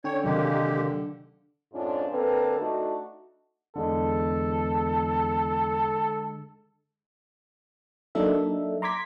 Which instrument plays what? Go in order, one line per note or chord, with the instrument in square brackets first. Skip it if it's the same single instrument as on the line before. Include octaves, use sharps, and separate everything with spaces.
[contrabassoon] D3 [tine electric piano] C#4 G5 [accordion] C#5
[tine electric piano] C3 D#3 F#3 [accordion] G#3 A#3 G4
[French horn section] F2 G#2 C#4 D4 F4
D3 A#3 C4 A4 B4
A3 D4 D#4 F#4
[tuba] E2 [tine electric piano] D3 G#3 [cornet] A4
[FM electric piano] F#3 A#3 D4 D#4 A4 E5
A#5 C6 D6 G#6 B6